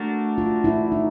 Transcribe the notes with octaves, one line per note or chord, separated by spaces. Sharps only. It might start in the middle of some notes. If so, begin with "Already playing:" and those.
Already playing: A3 D4 F#4 A#4
F4
E4
D#4